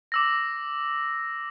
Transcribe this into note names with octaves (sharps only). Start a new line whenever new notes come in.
D6 E6 A#6